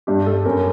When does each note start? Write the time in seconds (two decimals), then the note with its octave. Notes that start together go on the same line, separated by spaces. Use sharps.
0.07 G2 G4
0.26 G2 A4
0.45 F#2 A#4